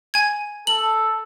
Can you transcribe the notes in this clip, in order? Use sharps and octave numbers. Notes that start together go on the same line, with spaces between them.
G#5 G#6
A4 F#7